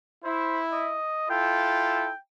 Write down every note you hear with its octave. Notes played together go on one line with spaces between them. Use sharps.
E4 C5
D#5
E4 F4 A4 G5